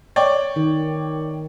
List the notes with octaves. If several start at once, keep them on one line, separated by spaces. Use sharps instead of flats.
C#5 D5 G5
D#3